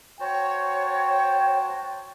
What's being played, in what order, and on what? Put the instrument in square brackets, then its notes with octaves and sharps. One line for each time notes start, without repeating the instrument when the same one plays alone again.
[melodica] F#4 C5 A5 [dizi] C#5 [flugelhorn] G5